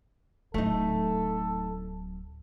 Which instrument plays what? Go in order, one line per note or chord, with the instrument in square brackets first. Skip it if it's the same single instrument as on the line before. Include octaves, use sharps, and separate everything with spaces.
[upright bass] D1 F#3 [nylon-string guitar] A3 D#4 [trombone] A4